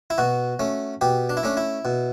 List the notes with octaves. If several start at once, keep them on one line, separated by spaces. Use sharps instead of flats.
E4
B2 F#4
A3 C#4
B2 G4
D4
E4
A3 C#4 D4
E4
B2